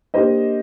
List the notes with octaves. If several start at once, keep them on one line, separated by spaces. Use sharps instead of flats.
A#3 D4 G4 C5 D#5